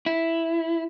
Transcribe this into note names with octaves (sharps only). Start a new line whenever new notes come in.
E4